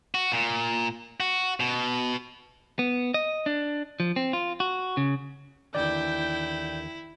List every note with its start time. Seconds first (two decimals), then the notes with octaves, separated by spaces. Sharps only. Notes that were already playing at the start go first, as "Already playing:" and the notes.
0.15 F#4
0.32 A#2
1.20 F#4
1.60 B2
2.79 B3
3.14 D#5
3.46 D4
4.00 F3
4.16 C4
4.33 F4
4.60 F#4
4.97 C#3
5.75 D#2 D3 E3 E4 D5 G5 G6